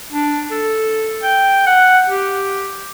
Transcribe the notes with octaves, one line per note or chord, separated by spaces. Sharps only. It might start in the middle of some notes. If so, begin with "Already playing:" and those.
D4
A4
G5
F#5
G4